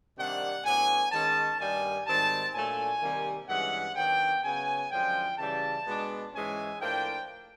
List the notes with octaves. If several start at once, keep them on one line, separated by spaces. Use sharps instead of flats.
C3 D#3 G3 A#3 D4 F#5
A2 F#3 B3 D4 G#5
D#3 G#3 C#4 A5
G2 D#3 G3 A#3 G#5
G#2 D#3 G3 C4 A5
A#2 F#3 A3 D4 G#5
C3 D#3 G3 A#3
G2 E3 G#3 C#4 F#5
D#3 F#3 B3 D4 G5
C#3 F#3 B3 G#5
F#2 D3 F3 G#3 G5
C#3 E3 G3 A5
B2 G#3 B3 D4
G#2 E3 G#3 C#4 G#5
A2 F3 A#3 D4 G5